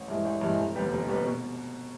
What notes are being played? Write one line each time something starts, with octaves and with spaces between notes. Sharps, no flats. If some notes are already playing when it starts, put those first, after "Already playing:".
Already playing: A1
G2 E3 G#3
A1
G2 E3 G#3
F1
D#2 D#3 G3 B3
F1
D#2 D#3 G3 B3
B2